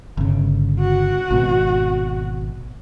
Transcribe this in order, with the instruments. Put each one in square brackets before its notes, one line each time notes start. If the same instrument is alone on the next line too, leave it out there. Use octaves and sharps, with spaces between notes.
[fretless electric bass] G1 C#3
[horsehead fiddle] F#4
[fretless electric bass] G#1 B2